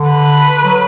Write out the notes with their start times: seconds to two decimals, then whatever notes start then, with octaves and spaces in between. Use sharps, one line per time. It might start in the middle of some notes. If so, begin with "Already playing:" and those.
Already playing: D3
0.10 B4
0.64 F#3